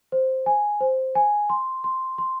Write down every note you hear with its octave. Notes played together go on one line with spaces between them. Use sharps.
C5
G#5
C5
G#5
C6
C6
C6